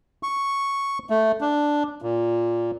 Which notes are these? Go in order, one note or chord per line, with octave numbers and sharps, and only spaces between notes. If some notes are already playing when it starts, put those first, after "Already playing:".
C#6
A3
D4
A#2